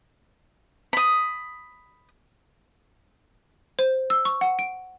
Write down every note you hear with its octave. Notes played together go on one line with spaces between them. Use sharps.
B5 D#6
C5
E6
C#6
F#5
D7